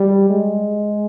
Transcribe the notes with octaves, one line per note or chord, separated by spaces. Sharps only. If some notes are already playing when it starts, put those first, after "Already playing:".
Already playing: G3
G#3